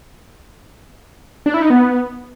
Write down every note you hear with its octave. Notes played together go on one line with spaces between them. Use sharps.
D4
E4
D#4
B3